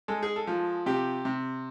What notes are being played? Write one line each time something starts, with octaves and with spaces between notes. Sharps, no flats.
G#3 A4
G#4
A4
F3
C3 G4
C3